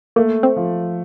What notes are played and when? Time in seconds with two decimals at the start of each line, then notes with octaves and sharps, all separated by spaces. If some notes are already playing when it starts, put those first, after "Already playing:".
0.16 A3 A#3
0.43 C4
0.56 F3